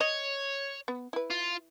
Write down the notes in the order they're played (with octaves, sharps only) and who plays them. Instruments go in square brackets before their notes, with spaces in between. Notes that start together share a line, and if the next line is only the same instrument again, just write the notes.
[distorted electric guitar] C#5 [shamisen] D#5
[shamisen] B3
E4 B4
[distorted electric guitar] F4